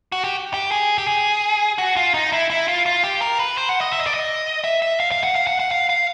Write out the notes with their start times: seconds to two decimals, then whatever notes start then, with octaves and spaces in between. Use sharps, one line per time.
0.12 F#4
0.24 G4
0.54 G4
0.71 G#4
0.98 G4
1.07 G#4
1.78 F#4
1.96 F4
2.14 D#4
2.32 E4
2.50 E4
2.68 F4
2.86 F4
3.04 G4
3.21 A#4
3.39 B4
3.57 C5
3.69 F#5
3.81 D#5
3.93 E5
4.00 D#5
4.07 D5
4.14 D#5
4.64 E5
4.82 E5
5.00 F5
5.12 F5
5.23 F#5
5.35 F5
5.47 F#5
5.60 F#5
5.71 F5
5.89 F5